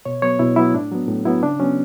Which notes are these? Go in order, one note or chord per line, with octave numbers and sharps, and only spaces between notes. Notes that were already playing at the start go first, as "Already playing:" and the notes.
B2 C#5
F#3 B3 C#5
B2 E4
F#3 B3 E4
A2 D4
F#3 B3
A2
F#3 B3 E4
C#3 D4
F#3 B3 C#4